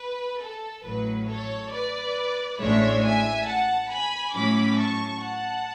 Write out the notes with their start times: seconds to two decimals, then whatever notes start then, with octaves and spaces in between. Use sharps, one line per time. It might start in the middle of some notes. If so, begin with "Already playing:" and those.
Already playing: B4
0.41 A4
0.84 A1 A2 F#3 B4
1.29 A4 C#5
1.72 B4 D5
2.59 A1 A2 G#3 D4 C#5 E5
3.04 E5 G#5
3.46 F#5 A5
3.90 G#5 B5
4.34 A2 F#3 C#4 B5 D6
4.78 A5 C#6
5.21 F#5 A5